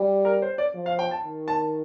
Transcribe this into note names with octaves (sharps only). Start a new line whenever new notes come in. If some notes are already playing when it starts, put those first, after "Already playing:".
Already playing: G3
A#4
C5
D5
F3
F5
G5
A5
D#3
A5